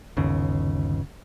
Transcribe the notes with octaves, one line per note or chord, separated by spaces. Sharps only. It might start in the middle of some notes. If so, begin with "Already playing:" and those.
G1 D#2 C#3